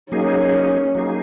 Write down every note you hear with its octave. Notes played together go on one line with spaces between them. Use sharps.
F#3 A#3 C#4 D#4 G#4
F#3 A#3 D#4 G#4